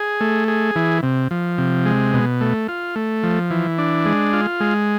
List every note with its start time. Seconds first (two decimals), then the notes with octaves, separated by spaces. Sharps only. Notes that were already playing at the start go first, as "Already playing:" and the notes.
Already playing: G#4
0.21 A3
0.48 G#4
0.76 E3
1.03 C3
1.31 F3
1.58 C3
1.85 G#3
2.13 B2
2.41 A3
2.68 F4
2.96 A3
3.23 F3
3.51 E3
3.78 D4
4.06 G#3
4.33 F4
4.60 G#3